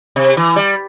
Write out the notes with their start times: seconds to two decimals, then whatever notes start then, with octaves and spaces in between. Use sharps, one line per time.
0.16 C3
0.37 E3
0.56 G3